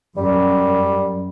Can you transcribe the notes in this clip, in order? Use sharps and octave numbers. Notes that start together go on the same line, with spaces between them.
F#2 G3